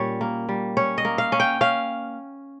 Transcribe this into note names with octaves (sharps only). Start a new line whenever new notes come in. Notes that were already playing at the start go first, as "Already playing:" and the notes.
Already playing: A#2 G3 C#4 C#5
A#3
G3
C#4 C#5
D#5
A#3
F5
C#4
G5
C#4 F5